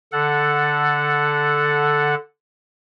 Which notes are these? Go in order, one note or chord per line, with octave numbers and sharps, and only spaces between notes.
D3 A4 F#5